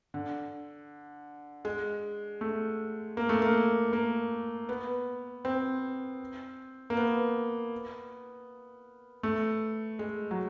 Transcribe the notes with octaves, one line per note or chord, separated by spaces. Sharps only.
D3
G#3
A3
A#3
A3
A#3
A#3
B3
C4
A#3
B3
A3
G#3
F#3